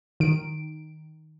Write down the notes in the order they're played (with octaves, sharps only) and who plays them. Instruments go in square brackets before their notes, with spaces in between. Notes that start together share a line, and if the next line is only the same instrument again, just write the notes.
[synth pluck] D#3 D7